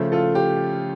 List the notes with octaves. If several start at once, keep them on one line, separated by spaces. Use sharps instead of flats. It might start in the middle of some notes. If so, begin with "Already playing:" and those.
Already playing: C#3 F3 A3
F4 A4
G4